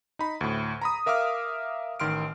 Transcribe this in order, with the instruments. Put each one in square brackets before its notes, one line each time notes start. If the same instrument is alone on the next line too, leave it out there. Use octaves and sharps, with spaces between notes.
[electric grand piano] D#4 B5
D2 A2
A#5 B5 D#6
A#4 E5 F5 D6 F6
A1 D#3 C6 F6 D7